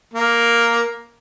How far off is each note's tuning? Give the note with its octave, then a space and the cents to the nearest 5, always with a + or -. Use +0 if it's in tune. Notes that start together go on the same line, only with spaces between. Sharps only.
A#3 +0